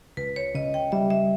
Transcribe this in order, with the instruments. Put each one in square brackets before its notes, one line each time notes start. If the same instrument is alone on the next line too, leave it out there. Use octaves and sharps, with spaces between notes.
[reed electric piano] C#2 [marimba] B4
[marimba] C#5
[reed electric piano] C#3 [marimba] D#5
[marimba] G5
[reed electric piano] G3 [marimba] E5
[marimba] E5